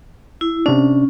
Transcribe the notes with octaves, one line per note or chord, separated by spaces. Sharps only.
E4
C3 C#4 D4